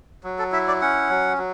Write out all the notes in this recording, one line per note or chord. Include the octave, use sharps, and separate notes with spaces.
F#3
A4
E4 E5
D5
C#4 F#5
F#3
F#3